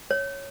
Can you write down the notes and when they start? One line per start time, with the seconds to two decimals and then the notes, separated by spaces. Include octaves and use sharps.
0.11 C#5